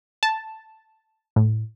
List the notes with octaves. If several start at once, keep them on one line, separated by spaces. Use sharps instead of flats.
A5
A2